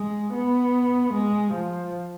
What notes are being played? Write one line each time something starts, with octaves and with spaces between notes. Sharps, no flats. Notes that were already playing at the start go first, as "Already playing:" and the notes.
Already playing: G#3
B3
G#3
F3